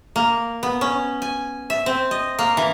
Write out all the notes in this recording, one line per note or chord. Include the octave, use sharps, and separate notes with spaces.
A#3
B3
C#4
G#5
E5
C4
D#5
A#3
E3